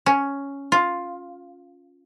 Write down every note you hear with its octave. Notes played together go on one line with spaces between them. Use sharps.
C#4
F4